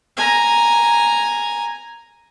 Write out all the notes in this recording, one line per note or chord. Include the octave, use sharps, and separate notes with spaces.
G#5 A#5